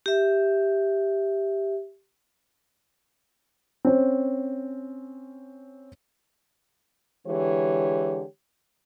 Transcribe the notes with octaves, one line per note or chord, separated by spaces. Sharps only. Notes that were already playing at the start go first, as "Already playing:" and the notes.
G4 E5
C4 C#4
D3 E3 G#3 G4 C#5